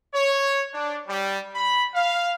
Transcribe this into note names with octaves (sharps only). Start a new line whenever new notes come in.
C#5
D4
G3
B5
F5